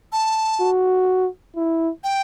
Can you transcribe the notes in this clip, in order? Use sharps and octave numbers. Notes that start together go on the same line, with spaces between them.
A5
F#4
E4
G5